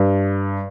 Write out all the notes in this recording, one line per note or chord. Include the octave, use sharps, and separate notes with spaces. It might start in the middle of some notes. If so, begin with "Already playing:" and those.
Already playing: G2